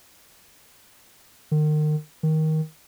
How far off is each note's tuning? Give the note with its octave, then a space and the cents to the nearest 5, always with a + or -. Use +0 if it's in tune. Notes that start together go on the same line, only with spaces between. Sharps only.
D#3 -35
D#3 +15